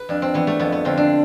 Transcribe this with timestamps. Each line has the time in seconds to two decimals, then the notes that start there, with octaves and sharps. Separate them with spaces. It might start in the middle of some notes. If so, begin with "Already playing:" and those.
Already playing: B4
0.09 F2 D4
0.22 C4
0.34 E3 B3
0.47 A3
0.59 F2 B3
0.72 B3
0.85 D3 F3 C4
0.97 D4